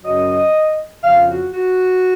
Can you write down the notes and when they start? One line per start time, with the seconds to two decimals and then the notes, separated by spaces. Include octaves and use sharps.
0.04 F#2 C#3 F#3 D#5
1.03 F2 C#3 F3 F5
1.29 F#4
1.53 F#4